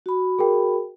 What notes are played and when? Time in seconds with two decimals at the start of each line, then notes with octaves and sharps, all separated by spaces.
0.06 F#4 B5
0.39 G#4 A#4 G5